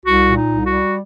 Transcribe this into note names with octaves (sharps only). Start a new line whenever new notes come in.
C2 F#4
A#2
D#4
C2
F#4
G3